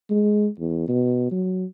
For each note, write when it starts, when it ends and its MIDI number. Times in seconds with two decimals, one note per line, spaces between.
0.10 0.48 56
0.59 0.88 40
0.88 1.27 47
1.31 1.64 54